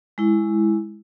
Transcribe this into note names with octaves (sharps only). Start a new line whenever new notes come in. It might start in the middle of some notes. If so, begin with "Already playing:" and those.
G#3 E4